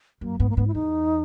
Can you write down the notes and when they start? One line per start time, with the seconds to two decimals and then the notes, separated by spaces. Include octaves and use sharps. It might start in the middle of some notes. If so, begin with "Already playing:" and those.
0.21 F#2 A#3
0.39 G#2 B3
0.50 A#3
0.57 G#2 B3
0.67 E4
0.74 E2 D#4